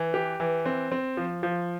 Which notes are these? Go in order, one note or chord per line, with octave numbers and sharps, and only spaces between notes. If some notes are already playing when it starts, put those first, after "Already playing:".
Already playing: E3
G4
E3
C4
C4
F3
F3